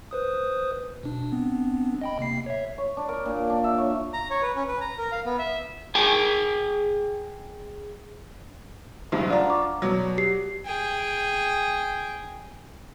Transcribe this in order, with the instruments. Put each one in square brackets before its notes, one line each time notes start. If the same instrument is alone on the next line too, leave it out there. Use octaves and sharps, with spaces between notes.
[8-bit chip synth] B4 C5 D#6
B2 D4
B3 C4 D4
D#5 G5 B5
C3 A#3 C7
C#5 E5
[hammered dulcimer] C#5
D4
A#4
A#2
D4
E5
C#5
[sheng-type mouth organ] A#5
C#5
B4
C#4
B4
A#5
A#4
F5
B3
E5
[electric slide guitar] G#4 G5 G#5
[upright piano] F#1 B1 G2
[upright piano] D4 F4 [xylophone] D5 F#5 A#5
[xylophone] C#6 D6
[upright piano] B2 F#3
[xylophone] G4 C7
[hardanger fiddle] G#4 G5